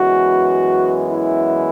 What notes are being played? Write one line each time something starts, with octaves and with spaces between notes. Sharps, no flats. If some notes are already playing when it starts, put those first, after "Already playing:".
Already playing: F#2 E3 G#3 B3 F#4
E4